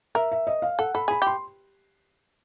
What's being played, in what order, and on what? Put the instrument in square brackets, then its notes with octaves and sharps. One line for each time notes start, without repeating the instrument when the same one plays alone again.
[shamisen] A#4 [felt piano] E5
[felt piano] E5
D#5
F5
[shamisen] A4 [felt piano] F#5
[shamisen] A4 [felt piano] B5
[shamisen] G#4 [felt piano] B5
[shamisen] G4 [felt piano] C6